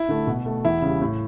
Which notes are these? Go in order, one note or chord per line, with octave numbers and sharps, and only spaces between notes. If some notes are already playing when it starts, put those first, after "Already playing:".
Already playing: E4
D3 A3
B2
A3
E2 E4
C#3 G3
A2